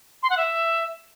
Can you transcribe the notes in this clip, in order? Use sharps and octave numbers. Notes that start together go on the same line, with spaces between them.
C6
F#5
E5